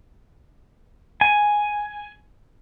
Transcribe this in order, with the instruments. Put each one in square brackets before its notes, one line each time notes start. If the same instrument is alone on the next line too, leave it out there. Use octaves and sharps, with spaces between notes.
[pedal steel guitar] G#5